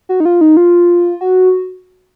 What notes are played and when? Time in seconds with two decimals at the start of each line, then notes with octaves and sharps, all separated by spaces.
0.09 F#4
0.20 D#4
0.25 F4
0.41 D#4
0.57 F4
1.21 F#4